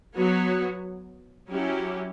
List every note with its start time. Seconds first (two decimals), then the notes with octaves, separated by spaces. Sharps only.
0.14 F#3 B3 F#4 C#5
1.48 F#3 C#4 E4 G4